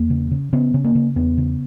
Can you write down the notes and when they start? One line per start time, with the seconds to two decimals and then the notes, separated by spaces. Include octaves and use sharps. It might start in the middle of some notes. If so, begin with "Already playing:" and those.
Already playing: E2 A#3
0.10 C#3
0.31 C#3
0.53 C#3 B3
0.74 C#3
0.84 A#3
0.95 C#3
1.16 E2 B3
1.38 C#3